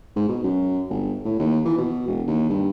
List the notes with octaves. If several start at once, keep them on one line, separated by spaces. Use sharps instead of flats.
G#2
B2
F#2
G1
A2
D#2
E3
B2
E1
D#2
G2